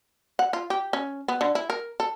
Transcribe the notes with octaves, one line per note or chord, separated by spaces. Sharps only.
F#5
F4
G4
C#4
B3
D3
E4
A#4
A4